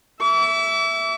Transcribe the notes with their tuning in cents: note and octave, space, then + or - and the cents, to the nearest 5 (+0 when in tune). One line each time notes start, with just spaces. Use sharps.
E5 +0 D6 -40